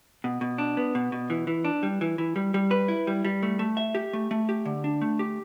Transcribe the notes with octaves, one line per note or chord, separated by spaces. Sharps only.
B2
B2
D4
B3
B2
B2
E3
E3
D4
G3
E3
E3
G3
G3
B4
E4
G3
G3
A3
A3
E5
G4
A3
A3
G4
D3
D4
A3
G4